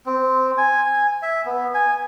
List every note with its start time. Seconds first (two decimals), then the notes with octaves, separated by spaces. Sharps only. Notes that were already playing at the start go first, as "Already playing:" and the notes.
0.06 C4
0.58 G#5
1.22 E5
1.46 B3
1.74 G#5